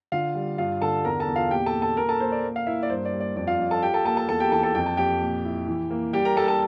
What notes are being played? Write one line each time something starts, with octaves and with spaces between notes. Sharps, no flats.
D3 F4 F5
G3
G2 F4 F5
D3 A4 A5
E2 A#4 A#5
A4 A5
E2
F4 F5
A#2 G4 G5
A4 A5
A#2
A4 A5
A#2 A#4 A#5
A4 A5
A#2 C5
D5
A#3
F5
A#3 E4 E5
D5
G2 C5
D5
G3
D5
F2 D5
F4 F5
F2
A4 A5
F4 G4 G5
A4 A5
A#3 A4 A5
A4 A5
E2 A4 A5
G4 G5
E3 A4 A5
A4 A5
F2 G5
A5
F2 G4 G5
A#2
E4
E3
A#3
G3 G4 G5
A#4 A#5
G3 A4 A5
A4 A5